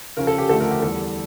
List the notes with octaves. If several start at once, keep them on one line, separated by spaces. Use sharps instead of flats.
C#3 F3 C#4 A#4
A4
G4
D2 D3 F3 A3 A4
A#4
G4
E2 E3 G3 A4